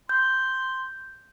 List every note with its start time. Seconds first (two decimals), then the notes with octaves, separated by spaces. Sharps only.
0.09 C6 G6